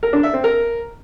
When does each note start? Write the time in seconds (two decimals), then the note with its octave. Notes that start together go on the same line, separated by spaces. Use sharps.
0.03 A#4
0.13 D4
0.23 E5
0.34 C4
0.44 A#4